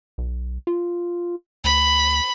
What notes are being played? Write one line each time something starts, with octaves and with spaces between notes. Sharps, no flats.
B1
F4
D2 B5